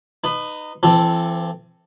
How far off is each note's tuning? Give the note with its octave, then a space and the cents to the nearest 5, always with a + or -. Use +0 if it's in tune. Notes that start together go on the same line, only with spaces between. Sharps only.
D#4 -20 B4 +15
E3 +40 C4 +0 A4 +0